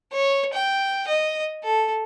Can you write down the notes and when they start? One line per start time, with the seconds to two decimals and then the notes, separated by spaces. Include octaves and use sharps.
0.12 C#5
0.53 G5
1.08 D#5
1.64 A4